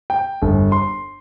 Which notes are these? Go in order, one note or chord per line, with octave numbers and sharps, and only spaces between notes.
G5
G1
C6